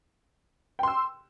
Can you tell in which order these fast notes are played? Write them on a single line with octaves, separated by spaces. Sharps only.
G5 C6 E6